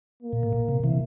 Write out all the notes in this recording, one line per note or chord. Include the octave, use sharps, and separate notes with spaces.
A#3
A#2
A2
A#2
C3
C3 E3